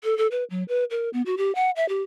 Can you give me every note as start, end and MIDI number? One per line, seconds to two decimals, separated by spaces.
0.04 0.17 69
0.18 0.27 69
0.31 0.44 71
0.50 0.63 54
0.68 0.84 71
0.91 1.10 70
1.13 1.22 59
1.26 1.36 66
1.38 1.54 67
1.55 1.70 78
1.76 1.87 76
1.89 2.03 67